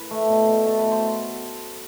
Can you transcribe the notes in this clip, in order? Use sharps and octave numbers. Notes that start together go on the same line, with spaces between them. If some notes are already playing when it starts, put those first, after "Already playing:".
Already playing: B4
A3
B2
B2
A3 A4
B4
B2
C5